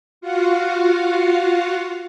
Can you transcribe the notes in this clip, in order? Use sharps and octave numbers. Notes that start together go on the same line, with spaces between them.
F4 F#4 F5 F#5